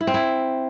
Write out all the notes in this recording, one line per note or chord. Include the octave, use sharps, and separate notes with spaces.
E4
C4
E4